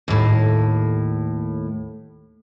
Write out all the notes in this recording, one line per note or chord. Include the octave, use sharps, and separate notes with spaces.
D#2 A2